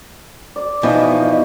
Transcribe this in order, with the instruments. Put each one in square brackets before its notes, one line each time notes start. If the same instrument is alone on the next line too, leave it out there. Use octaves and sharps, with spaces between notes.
[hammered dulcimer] D5
[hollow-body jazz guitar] B2 F3 [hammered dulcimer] E3 [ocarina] D#4 [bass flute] D#5